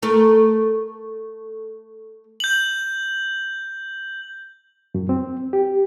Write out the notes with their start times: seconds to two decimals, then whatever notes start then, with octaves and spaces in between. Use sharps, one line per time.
0.03 A3 A4 A#4
2.40 G6 F#7
4.95 F#2
5.09 C4
5.53 G4